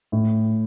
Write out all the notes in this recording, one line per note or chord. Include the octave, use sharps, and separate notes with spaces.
A2